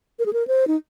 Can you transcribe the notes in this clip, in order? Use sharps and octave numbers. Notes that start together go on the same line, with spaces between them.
A#4
G#4
A#4
C5
D#4